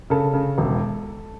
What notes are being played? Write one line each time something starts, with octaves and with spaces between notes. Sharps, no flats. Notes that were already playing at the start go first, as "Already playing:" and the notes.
C#3 A4
C#3
E1